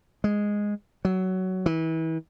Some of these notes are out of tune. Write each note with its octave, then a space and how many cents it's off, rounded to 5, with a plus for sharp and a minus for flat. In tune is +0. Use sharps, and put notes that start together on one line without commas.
G#3 -5
F#3 +15
E3 -30